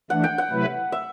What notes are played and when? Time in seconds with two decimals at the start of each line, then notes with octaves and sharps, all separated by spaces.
0.10 E3 A3 D4 F#5
0.24 G5
0.38 F#5
0.51 C3 F#3 A3 E4 B4
0.92 E5